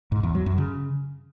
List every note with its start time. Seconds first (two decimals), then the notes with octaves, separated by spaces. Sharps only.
0.12 G#2
0.23 E2
0.35 F#3
0.46 F#2
0.58 C#3